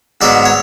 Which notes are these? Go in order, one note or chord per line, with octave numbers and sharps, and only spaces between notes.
G#2 F#3 B3 D5
C#5